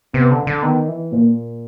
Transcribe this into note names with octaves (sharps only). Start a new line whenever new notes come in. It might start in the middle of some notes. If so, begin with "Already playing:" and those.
C3 B3
D3
D3
D#3 B3
E3
A#2 A#3